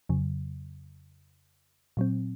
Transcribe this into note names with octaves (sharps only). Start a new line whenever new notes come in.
F2 C#3 F#3
A#2 F#3 C4